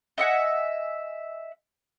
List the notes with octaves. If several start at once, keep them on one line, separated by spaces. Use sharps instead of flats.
D#5 E5 F#5 G#5